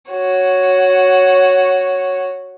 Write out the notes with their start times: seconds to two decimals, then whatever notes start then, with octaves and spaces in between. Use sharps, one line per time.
0.11 F#4 C#5